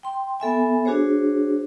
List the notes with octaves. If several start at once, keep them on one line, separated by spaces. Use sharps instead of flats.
G5 C6
B3 A4 E5 G#5
D4 F#4 G#4 C5 C#5